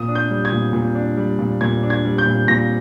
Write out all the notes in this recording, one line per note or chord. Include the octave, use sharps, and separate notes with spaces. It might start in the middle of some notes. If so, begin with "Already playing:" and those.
Already playing: A#2 D#6
D4
G6
G3
G#6
A#2
A#2
D4
G3
A#2
A#2 G#6
D4
G#6
G3
G6
A#2
A#2 A#6